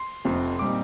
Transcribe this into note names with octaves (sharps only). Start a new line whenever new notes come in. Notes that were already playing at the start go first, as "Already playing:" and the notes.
Already playing: C6
F1 F2 C3 F3
A#2 G3 C4 D#4 D6